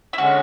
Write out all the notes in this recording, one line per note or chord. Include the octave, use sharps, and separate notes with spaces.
E4
D3 G#3 C#4 F#4